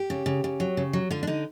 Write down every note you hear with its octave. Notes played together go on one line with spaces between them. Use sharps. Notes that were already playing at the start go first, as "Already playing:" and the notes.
Already playing: G4
C#3
C#3
C#3
F#3
C#3
F#3
D3 F4
D4
D3 D#4